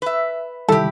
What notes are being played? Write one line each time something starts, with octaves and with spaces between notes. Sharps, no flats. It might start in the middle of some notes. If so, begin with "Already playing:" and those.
B4 E5
C3 D#3 G3 E4 G4 A4